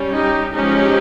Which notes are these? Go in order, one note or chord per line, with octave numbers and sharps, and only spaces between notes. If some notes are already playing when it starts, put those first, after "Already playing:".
Already playing: G3 C#4
D#4 G4
F3 G#3 C#4 D#4 G4